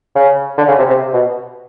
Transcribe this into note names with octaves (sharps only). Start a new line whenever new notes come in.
C#3
D3
C#3
C3
C3
B2